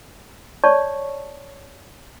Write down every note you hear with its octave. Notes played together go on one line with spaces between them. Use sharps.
C#5 D5 A5 C#6